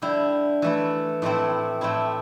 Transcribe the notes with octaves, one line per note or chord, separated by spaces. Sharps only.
D3 G3 E4
E3 A3 E4
A2 E3 A3 C4 E4
A2 A3 C4 E4